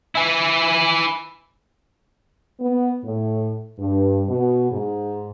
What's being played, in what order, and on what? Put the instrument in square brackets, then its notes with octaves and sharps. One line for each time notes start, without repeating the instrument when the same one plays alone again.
[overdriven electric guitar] E4 G#5
[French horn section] B3
A2
G2
B2
G#2